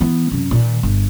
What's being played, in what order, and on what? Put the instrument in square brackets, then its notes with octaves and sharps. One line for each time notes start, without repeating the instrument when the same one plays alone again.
[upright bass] E3 B3
F#2 C3
A#2 D#3
G1